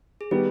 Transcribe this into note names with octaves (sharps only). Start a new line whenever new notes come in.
G#4
D#3 G3 B3 G4